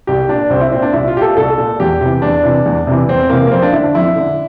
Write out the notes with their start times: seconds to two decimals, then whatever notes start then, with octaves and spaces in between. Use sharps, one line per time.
0.07 C2 G4
0.29 A#2 D4
0.50 C2 C4
0.61 E4
0.72 A#2 C4
0.82 D4
0.93 C2 E4
1.08 F4
1.15 A#2 G4
1.22 A4
1.37 C2 A4
1.58 A#2
1.80 E2 G4
2.01 C3 E3 G4
2.22 E2 D4
2.43 C3 E3
2.66 E2
2.87 C3 E3
3.08 E2 C4
3.30 C3 E3 A#3
3.47 A#3
3.52 F2 C4
3.62 D4
3.72 D3 E4
3.84 D4
3.95 F2 E4
4.16 D3